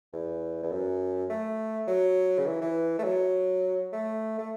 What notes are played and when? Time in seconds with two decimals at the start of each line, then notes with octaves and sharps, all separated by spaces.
0.13 E2
0.63 E2
0.72 F#2
1.30 A3
1.88 F#3
2.38 C#3
2.47 E3
2.62 E3
2.99 A3
3.04 F#3
3.93 A3
4.39 A3